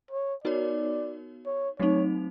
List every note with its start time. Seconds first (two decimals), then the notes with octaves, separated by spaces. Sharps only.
0.11 C#5
0.44 B3 D#4 F#4 A#4 C#5 D5
1.46 C#5
1.79 F#3 A3 C4 D#4 C#5